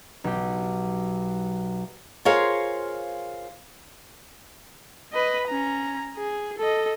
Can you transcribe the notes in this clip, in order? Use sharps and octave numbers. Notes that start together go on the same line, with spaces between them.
B1 G4
F4 G#4 A#4 C5 C#5 F5
B4 D#5
C#4 A#5
G#4
A4 D#5